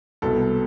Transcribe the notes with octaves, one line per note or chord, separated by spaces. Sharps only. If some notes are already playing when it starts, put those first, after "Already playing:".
C2 B2 A4